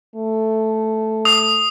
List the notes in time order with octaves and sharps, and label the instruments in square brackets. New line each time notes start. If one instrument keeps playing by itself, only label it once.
[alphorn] A3
[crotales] D#6